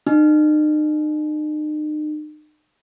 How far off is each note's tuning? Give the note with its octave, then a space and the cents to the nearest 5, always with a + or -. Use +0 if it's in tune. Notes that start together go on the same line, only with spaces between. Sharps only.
D#4 -40